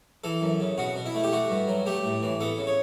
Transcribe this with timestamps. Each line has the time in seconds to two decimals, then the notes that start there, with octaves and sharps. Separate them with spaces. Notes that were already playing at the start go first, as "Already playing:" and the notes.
0.24 E3 A4
0.42 F#2
0.60 C#3
0.78 B2 F#4
0.96 B2
1.06 E4
1.14 A3
1.24 G4
1.32 A3 F#4
1.50 G2
1.68 F#3
1.86 A3 G4
2.04 A2
2.22 E3
2.40 B3 A4
2.59 C#3
2.67 C#5